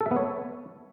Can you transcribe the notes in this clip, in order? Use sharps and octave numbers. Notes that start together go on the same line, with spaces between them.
A4
E5
B3
C#5